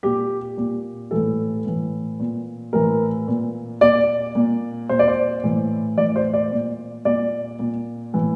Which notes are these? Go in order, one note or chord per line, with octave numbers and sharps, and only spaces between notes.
A#2 G4
A#2
A2 E3 A4
A2 E3
A#2
A2 E3 A#4
A#2
A#2 D5
A#2
A#2 C5
D5
C5
A2 E3
A2 E3 D5
C5
D5
A#2
A#2 D5
A#2
A2 E3